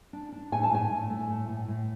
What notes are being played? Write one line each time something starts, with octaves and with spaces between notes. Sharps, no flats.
D4
D4
A2 G#5
A5
A2 G#5
A2
A3
A2
A2
A2